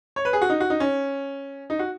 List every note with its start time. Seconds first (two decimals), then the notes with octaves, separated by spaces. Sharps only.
0.16 C#5
0.25 B4
0.33 G#4
0.41 F#4
0.50 D#4
0.60 F#4
0.70 D#4
0.80 C#4
1.70 D#4
1.79 F#4